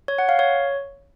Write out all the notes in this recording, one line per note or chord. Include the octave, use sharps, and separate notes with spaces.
C#5
F#5
F5
C#5